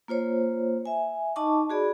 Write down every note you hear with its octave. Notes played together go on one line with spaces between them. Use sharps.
A#3 F4 C5 C#5
E5 G#5
D#4 D#5 A5 C#6 D6
F#4 G#4 D5 B5